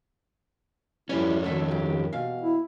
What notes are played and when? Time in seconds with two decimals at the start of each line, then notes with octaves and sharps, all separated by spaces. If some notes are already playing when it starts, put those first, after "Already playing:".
1.09 F2 E3 G3 C#4 E4
1.44 D2 D#3 A3 A4
1.68 G2 G4
2.13 E2 B2 F5
2.42 E4